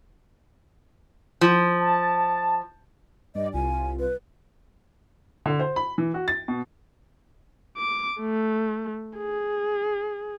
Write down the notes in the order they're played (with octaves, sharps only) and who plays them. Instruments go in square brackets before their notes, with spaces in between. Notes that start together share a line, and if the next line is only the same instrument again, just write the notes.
[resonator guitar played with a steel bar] F3
[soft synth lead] A5
[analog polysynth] G2 D5 [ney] D#5
[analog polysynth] C2 F4 [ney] G#5
[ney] B4
[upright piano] D3
C5
B5
E3
F#4
A6
B2
[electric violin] D6
A3
G#4